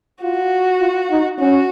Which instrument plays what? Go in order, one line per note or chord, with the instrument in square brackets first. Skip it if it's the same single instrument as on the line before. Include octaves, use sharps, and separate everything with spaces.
[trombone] F4 [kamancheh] F#4
[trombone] F4
D#4
[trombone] C#4 [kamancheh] F#4